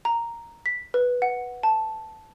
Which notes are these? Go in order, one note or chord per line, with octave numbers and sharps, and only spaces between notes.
A#5
B6
B4
F#5
A5